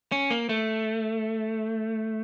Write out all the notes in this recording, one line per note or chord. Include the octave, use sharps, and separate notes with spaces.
C#4
A#3
A3